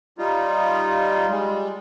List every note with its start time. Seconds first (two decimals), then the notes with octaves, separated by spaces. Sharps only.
0.18 G3 D#4 F4
1.30 G3 G#3